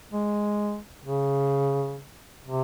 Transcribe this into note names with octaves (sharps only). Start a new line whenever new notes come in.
G#3
C#3
C3